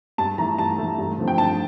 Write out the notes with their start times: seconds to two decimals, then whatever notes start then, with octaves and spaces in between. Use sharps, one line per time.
0.18 G2 A5
0.38 E3 A3 A#5
0.58 G2 A5
0.78 E3 A3
0.98 G2
1.18 D3 F3 A3 C4
1.28 G5
1.38 G2 A5